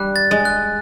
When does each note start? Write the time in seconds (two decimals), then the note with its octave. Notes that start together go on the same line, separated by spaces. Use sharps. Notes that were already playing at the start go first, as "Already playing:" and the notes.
Already playing: G3 F#6
0.16 A6
0.31 G#3
0.45 F#6